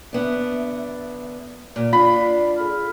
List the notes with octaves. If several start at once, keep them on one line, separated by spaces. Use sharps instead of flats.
D3 B3 D4 E5
A#2
D4 F4 D5 B5
G#4 A4 F6